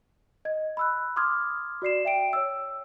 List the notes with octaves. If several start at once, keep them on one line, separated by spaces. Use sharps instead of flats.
D#5 G#6
B5 E6 F#6
C6 D6 D#6 F6 G#6
F#4 D5 C7 E7
E5 G5 D7
C#5 E6